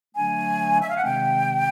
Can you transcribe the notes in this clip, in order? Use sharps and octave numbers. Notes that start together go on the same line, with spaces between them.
D3 F#3 A3 D4 G#5
E5
F5
F#5
C3 D#3 G#3 C4 G5